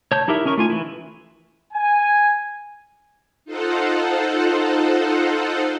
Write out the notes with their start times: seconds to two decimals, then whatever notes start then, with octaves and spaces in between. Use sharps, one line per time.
0.12 C#5 A5 G6
0.28 D#4 E4 G4 A#4 E5
0.46 C#4 D#4 A#4 C#6
0.57 A3 F4 G#5
0.70 E3 E4
1.73 G#5
3.45 D#4 F4 A4 C5 F#5